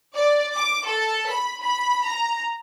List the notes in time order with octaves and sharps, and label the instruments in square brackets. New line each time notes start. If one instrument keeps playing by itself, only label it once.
[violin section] D5
D6
A4
B5
B5
A#5